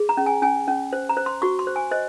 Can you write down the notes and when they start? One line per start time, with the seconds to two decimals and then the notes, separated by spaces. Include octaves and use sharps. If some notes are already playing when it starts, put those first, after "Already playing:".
Already playing: G#4
0.09 A#5
0.17 C#4
0.26 G#5
0.42 C#4 G#5
0.68 C#4
0.93 C5
1.09 A#5
1.17 C5
1.26 C6
1.42 F#4 C#6
1.59 C6
1.67 C5
1.76 G#5
1.91 C5 D#5